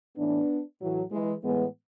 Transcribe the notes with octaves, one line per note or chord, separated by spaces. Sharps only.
A2 E3 B3 D4
A2 E3 F#3
E3 G#3
A2 E3 G#3 B3